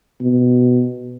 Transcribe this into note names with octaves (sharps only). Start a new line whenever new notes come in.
B2